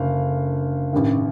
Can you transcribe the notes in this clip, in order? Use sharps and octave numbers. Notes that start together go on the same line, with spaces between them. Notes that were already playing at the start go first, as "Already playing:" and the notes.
Already playing: F#1 D3 F5
A1 G2 D#3